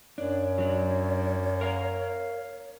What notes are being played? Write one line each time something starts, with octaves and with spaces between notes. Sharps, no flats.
F#2 D4 C#5
F#3 D4
A#4 F5 A#5